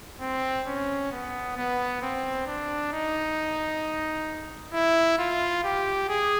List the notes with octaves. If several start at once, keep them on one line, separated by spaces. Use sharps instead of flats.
C4
C#4
B3
B3
C4
D4
D#4
E4
F4
G4
G#4